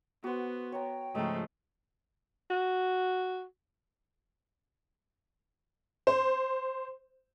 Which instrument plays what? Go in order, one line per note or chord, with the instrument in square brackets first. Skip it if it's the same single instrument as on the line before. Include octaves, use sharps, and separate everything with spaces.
[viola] B3 [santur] F#4 C5
[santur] C#5 A#5 [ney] G5
[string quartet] G#2 C#3 F3 [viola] A3 [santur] D#5 A#5
[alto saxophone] F#4
[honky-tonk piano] C5